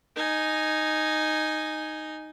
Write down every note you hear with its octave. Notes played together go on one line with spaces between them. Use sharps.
D#4 G#5